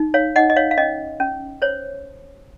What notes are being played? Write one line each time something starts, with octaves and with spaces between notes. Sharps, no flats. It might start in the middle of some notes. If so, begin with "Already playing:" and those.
Already playing: D#4
C#5 F5
D#4 D#5 F#5
D#5
C#5 F5
F5
C#4 D#5
C#4
C5 C#5